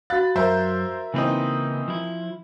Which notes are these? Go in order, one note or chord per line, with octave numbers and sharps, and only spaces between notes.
F#4 F5 B5 F#6 A6
F#2 A#4 C5 E5
C#3 E3 A#3 C4 D#4 B4
F3 E4